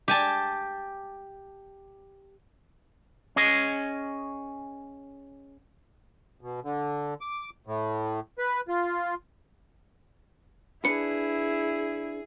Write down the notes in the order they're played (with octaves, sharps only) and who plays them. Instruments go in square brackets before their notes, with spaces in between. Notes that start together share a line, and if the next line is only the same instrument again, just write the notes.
[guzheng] G4 G#5 A5
[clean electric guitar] C#4 G#4 D#5
[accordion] B2
D3
D6
A2
B4
F4
[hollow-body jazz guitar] D4 B4 [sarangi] E4 [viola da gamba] G#4 [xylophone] C#7